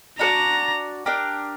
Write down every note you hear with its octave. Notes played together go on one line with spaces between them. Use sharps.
D4 F#4 A#4 D5 A#5
D4 G4 A#4